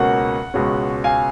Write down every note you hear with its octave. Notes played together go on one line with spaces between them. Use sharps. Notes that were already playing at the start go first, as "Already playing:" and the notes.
Already playing: C#2 B2 A#3 C#4 F#5
C#2 B2 G#3 C#4
F5 G#5